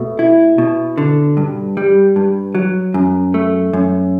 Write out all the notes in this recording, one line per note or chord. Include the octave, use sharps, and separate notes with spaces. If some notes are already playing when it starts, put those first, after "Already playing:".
Already playing: B2 A3
E4
B2
D3
G2
G3
G2
F#3
F#2
A3
F#2